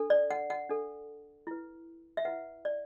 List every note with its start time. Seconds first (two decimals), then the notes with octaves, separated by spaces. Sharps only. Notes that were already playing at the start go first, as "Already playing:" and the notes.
Already playing: D4 A4
0.10 D5
0.31 F#5
0.50 F#5
0.69 D4 A4
1.47 E4 B4
2.17 E5
2.25 E4 B4 F#5
2.65 D5